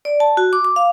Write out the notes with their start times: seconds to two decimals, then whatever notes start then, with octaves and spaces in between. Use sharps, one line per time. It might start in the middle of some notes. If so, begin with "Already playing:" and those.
0.05 D5
0.20 A5
0.37 F#4
0.53 D6
0.65 D6
0.76 F5